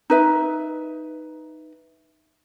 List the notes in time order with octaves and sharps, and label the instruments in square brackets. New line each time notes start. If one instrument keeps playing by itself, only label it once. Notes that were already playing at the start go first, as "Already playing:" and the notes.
[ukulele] D#4 B4 E5